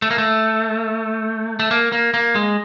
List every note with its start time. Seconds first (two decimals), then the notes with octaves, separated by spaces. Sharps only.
0.02 A3
0.11 A#3
0.18 A3
1.60 A3
1.71 A#3
1.92 A#3
2.14 A#3
2.35 G#3